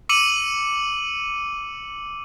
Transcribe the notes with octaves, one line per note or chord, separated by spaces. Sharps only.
D6 E6 C#7 D#7 F#7